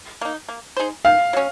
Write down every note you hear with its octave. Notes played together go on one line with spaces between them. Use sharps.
A#3 D#4
A#3
D#4 G#4 C5
D#3 F5
F#3 C#4